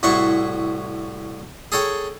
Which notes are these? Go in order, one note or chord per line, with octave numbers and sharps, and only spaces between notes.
C2 A2 E4 F#4 C6 C#6
G#4 A4 C#5 G5